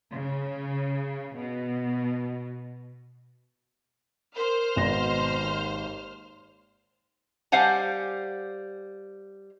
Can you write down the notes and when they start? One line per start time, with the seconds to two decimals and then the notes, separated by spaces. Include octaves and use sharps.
0.14 C#3
1.39 B2
4.37 A#4 C5 F6
4.76 G#1 B2 A#6
5.40 D#2
7.52 G3 C5 F5 F#5 G#5